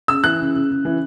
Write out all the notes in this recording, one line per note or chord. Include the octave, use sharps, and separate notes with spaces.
C#3 E6
E3 F#6
C#3
C#3
C#3
E3